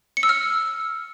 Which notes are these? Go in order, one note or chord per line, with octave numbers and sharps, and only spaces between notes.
C#7
E6
F6